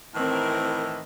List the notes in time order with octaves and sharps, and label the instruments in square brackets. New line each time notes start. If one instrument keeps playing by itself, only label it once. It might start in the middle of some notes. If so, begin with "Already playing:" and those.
[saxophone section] A2 D#3 E3 [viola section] C4 A#4